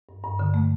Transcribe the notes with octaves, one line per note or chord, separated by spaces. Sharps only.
G2
G2
D3
A3